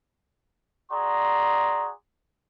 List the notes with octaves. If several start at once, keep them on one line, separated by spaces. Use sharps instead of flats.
F#4 G#4 D5 A#5 C6